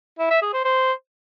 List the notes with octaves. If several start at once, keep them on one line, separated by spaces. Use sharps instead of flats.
E4
E5
G#4
C5
C5